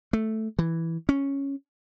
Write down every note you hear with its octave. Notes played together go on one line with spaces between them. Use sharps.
A3
E3
C#4